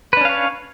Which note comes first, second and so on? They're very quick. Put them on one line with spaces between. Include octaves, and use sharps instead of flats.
B4 D4 C#4 F5 C#5